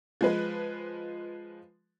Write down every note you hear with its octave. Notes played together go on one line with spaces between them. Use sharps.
F3 G#3 B4